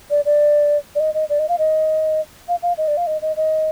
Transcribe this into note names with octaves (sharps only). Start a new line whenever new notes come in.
D5
D5
D5
D#5
D#5
D5
D#5
F5
D#5
F5
F5
D#5
D5
F5
D#5
D#5
D#5